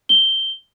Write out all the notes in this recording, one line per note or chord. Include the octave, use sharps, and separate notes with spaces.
G7